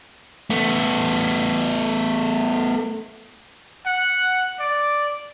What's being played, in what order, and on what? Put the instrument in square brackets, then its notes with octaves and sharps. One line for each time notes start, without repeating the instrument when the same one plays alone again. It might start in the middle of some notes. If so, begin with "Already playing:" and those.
[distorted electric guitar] A3 B3
[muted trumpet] F#5
D5